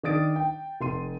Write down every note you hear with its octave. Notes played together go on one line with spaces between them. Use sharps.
D#3 D4 D#6 A6 D7
G5
F1 C6 D#7